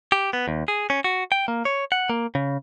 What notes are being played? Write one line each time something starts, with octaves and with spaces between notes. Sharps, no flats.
G4
B3
D#2
G#4
C#4
F#4
G5
A#3
C#5
F#5
A#3
C#3